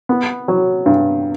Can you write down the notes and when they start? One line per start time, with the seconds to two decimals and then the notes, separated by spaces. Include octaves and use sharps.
0.09 B3
0.48 F#3
0.86 G2